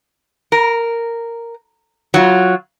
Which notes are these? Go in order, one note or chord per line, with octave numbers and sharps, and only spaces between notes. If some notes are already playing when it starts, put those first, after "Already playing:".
A#4
F#3 F4